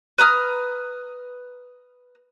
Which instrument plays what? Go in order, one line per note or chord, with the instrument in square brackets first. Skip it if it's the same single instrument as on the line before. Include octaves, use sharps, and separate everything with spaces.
[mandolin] B4 A#5 D#6 F6